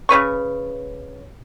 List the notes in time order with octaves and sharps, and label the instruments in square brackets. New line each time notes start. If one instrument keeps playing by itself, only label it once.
[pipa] C#3 C#4 B4 C#6